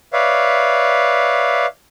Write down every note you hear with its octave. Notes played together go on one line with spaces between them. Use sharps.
B4 C#5 D5 E5 F5